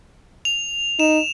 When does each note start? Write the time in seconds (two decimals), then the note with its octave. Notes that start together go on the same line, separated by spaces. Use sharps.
0.45 F7
0.99 D#4 E7